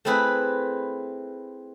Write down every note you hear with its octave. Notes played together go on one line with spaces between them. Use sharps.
A3 C4 E4 G#4 B4